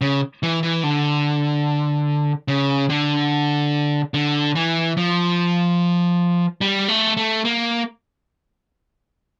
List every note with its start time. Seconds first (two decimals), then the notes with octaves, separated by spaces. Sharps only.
0.01 C#3
0.43 E3
0.63 E3
0.84 D3
2.48 C#3
2.90 D3
4.14 D3
4.55 E3
4.97 F3
6.61 G3
6.88 A3
7.17 A3
7.45 A#3